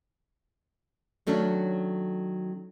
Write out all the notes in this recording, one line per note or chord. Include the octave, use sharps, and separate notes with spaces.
D#3 F#3 A3 C#4 D4